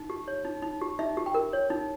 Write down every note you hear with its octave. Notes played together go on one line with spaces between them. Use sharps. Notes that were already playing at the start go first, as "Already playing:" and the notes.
Already playing: D#4
G4
C#5
D#4
D#4
G4
D#4 E5
G4
G5
A#4
C#5
D#4